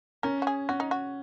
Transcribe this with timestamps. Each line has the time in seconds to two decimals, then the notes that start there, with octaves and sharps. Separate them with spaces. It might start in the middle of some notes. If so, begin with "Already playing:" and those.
0.23 C#4 A#4
0.42 F#4
0.47 G#4
0.69 C#4 F#4
0.80 D#4
0.91 F#4